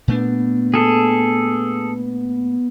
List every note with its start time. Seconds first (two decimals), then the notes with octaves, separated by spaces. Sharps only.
0.08 A#2 A3 B3 D4
0.74 G#4 A4